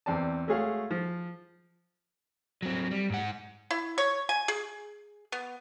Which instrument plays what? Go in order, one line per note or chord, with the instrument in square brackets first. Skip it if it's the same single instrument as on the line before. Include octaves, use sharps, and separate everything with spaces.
[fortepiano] E2 C4 D5 A5
G#3 A3 F#4 G#4 C#5 F5
F3
[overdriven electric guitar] F#3 C4
G3
G#2 F#5
[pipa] E4
C#5
G#5
G#4
B3